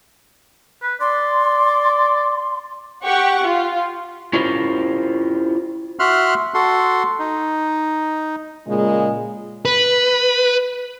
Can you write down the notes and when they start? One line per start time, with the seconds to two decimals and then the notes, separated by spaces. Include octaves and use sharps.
0.83 B4
1.01 D5 C6
3.03 G4 F#5 C#6
3.43 F4
4.33 C#4 E4 F4 G4 A#4 C5
5.99 F#4 E5 C6 F6 F#6
6.54 F#4 A4 C6
7.19 D#4
8.67 A#2 C#3 G#3
9.65 B4